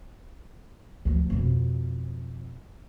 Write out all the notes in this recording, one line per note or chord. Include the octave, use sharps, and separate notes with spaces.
D2 F3
F2 B2